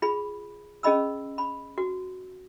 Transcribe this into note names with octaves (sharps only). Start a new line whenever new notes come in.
F4 G#4 B5
C#4 G#4 D#5 B5 E6
B5
F#4